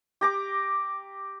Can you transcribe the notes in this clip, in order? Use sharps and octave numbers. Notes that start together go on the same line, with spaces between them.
G4 A#5 D6